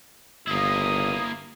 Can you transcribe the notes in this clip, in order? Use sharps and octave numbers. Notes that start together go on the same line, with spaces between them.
G1 A#3 E4 D#6